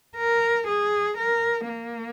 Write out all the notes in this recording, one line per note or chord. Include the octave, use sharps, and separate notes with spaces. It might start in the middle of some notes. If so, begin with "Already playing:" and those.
A#4
G#4
A#4
A#3